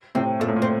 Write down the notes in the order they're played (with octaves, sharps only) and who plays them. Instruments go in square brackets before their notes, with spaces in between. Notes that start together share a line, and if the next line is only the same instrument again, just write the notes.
[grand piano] A2 C3 [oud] C4
[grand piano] A#2 [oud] A3
[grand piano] A2
A#2
[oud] C4